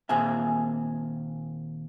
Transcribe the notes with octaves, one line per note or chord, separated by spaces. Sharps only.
D#2 A#2 C4 F4 G#4 E5